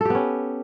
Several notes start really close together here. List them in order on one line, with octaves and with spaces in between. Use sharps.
A4 G4 B3 C#4